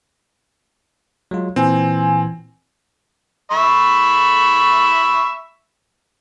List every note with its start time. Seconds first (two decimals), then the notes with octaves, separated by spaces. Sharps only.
1.31 F#3 G#3 F4
1.56 A#2 E3 C4 G#5
3.51 E5 B5 C#6